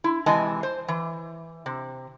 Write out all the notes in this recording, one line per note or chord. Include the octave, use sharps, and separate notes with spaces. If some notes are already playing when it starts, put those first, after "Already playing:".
E4
C3 E3 G#3 G#5 A5
C5
E3
C3